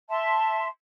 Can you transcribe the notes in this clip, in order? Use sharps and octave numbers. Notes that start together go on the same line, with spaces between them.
E5 A5 C6